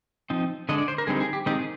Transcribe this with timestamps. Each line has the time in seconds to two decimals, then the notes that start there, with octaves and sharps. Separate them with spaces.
0.30 F3 C4 D#4
0.69 D3 G#3 D4 D#5
0.78 D5
0.88 C5
0.98 A#4
1.07 D3 G3 C4 D#4 G#4
1.20 G#4
1.33 G4
1.46 D#3 G#3 C4 D#4 G4
1.59 G#4